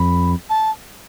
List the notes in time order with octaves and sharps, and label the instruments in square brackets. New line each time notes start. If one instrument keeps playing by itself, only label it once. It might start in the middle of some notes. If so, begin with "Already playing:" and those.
Already playing: [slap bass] F2 [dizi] B5
[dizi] A5